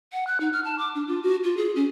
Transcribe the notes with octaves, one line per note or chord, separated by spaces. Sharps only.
F#5
F#6
D#4
F6
A5
D6
D4
F4
F#4
F4
G#4
C#4